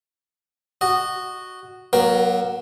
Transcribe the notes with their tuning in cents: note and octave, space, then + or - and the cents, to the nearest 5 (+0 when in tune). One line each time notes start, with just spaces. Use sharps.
F#4 +0 D#5 -15
F#3 +10 A#3 +45 A#4 +0